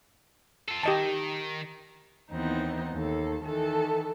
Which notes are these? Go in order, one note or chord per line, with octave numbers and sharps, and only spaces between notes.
F4 A4
D#3 G4 D#5 A5
D#2 E3 B3 C4 D#4
D#2 A4
D#3 E3 A4